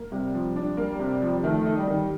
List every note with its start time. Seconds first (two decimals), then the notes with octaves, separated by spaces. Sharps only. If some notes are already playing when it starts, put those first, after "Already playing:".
Already playing: A#3
0.11 C3 G3
0.34 F3
0.56 D4
0.77 G3 A#3
0.99 C3
1.22 F3
1.44 D#3 A3
1.66 D#4
1.77 G3
1.88 D#3